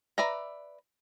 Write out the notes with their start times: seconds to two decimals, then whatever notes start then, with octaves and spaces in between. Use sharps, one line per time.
0.18 B4 D5 E5 A#5